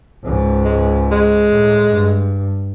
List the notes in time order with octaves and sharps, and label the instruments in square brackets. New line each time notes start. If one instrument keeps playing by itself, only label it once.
[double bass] C#2 G#2
[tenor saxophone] G#3
G#3
[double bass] A2
G2